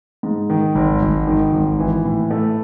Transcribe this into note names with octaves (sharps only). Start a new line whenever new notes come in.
G#2
D#3
G#1
G#1
D#3
G#1
E3
A2
A3